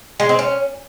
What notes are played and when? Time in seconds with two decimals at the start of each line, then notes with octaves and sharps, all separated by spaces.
0.20 G#3
0.29 C4
0.39 C#4